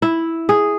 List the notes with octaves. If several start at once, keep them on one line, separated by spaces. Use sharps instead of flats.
E4
G#4